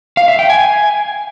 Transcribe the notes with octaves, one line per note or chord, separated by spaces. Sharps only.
F5
E5
G5
G#5